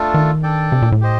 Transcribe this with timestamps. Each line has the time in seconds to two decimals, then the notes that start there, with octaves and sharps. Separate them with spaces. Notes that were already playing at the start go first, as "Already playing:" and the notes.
Already playing: A3 D4 F4 A4
0.14 D#3
0.43 D4 A4 D5 G5
0.72 C3
0.82 A#2
0.92 A2
1.01 G4 C5 D#5